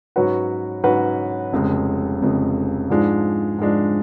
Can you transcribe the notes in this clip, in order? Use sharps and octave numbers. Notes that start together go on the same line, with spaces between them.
G#2 F#3 C#4 F#4 B4
G#2 F#3 C#4 F#4 B4
F1 F2 C#3 G#3
F1 F2 C#3 G#3
G#2 F3 G#3 D4
G#2 F3 G#3 D4